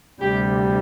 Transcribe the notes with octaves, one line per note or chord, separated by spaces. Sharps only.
D2 C3 G3 G4